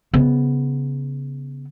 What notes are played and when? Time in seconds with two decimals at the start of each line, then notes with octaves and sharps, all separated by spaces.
0.14 C#3 B3